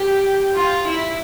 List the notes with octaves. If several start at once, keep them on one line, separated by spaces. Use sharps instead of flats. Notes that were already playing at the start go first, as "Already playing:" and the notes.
Already playing: G4
F4
E4